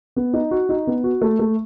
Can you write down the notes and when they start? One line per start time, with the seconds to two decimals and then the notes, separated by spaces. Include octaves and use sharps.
0.16 B3
0.33 D#4
0.51 F#4
0.69 D#4
0.87 B3
1.04 F#4
1.22 A3
1.39 A3